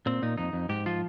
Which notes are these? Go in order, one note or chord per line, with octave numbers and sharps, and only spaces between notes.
A#2 C4
A#2 D#4
F2 D#4
F2
G#2 G4
F3 F4